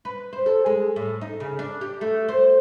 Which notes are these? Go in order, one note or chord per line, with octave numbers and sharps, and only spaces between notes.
B4
C5
A4
G#3
A2
D#4
C#3
D4
G4
A3
C5